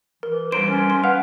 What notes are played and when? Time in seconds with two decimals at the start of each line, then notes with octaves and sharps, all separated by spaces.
0.23 E3 A#4
0.52 G2 A#4 C5 D7
0.68 C#4
0.90 C6
1.04 B4 F5 F#5